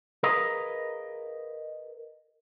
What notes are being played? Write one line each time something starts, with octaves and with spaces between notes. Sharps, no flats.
G#4 A#4 B4 D#5 F5 A#5